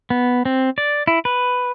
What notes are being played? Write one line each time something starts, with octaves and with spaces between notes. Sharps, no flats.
B3
C4
D5
E4
B4